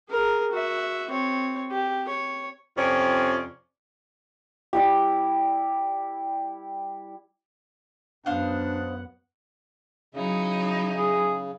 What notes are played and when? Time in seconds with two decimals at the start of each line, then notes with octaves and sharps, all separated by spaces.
0.10 G#4 A#4
0.52 F#4 E5
1.10 C4 C#5
1.71 G4
2.08 C#5
2.77 F2 C3 C#4 F4 D5
4.73 G3 E4 G4
8.26 F#2 B3 D4 C5 F5 F#5 D#6
10.14 C#3 F#3 D#4 E4
10.97 G#4